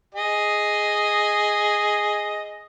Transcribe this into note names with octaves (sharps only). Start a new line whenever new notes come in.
G#4 D#5